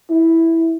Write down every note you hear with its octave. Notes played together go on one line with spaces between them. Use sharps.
E4